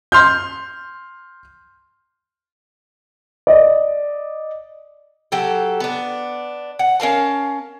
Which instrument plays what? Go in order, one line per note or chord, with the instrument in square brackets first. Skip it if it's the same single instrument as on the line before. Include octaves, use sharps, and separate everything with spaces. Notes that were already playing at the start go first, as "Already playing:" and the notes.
[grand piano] C6 F6 G6
D5 D#5
[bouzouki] F#3 G4 A4
B3 D4
F#5
C#4 A#4 F5 A5